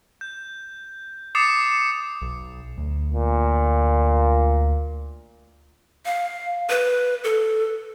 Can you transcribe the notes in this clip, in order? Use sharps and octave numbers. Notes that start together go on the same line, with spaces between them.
G6
D6 D#6 A6 C7 C#7 E7
B1
D2
A#2
F5
B4
A4